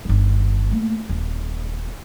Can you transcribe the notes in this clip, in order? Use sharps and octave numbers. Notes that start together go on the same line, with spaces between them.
G1 D#3
A3 A#3
D#1